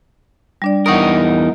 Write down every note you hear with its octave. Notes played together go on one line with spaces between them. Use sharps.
G3 D4 D5
E2 D#4 A#4 F#5 C#6 D#6